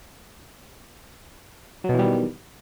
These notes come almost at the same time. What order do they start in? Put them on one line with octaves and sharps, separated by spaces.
F#3 B2 E3 G3 D#3